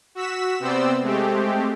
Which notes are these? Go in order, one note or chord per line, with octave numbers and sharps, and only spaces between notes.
F#4 E6 B6 E7
C3 B3 C4 C5 D5 E6
G#3 A3 C4 G4